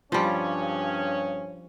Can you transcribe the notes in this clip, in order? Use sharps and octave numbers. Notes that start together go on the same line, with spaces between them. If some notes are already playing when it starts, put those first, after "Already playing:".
G2 C#3 F3 G3 C#4